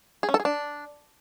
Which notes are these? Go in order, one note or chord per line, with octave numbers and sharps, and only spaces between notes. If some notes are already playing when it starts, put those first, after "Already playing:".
G#4
C#4
A4
G#4
D4